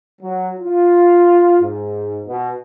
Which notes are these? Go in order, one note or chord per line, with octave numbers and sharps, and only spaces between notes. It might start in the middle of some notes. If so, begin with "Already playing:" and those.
F#3
F4
G#2
B2